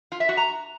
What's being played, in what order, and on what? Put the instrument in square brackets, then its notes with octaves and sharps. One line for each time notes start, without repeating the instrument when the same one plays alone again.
[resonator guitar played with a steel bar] F4
E5
F#4
A#5